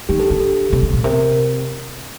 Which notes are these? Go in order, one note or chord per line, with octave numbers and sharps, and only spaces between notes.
D#3 G4
D3 A4
D3 G4
A4
C3
C3
A#2
C3 A#4